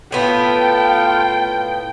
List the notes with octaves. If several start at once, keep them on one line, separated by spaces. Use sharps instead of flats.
A2 B3 F4 A4 G5